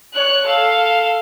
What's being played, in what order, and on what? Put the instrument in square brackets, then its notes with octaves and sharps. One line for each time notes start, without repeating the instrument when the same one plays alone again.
[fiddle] C#5 F#6
A4 F5